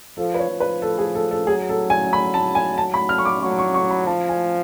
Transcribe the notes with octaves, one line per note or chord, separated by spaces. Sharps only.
F3 A4
B4
C#5
F3
B4
A4
G#4
A4
A4
F#3 G#4
A4
G#5
B5
A5
G#5
A5
B5
F6
C#6
D6
F#3 C#6
C#6
C#6
B5
F3 A5
G#5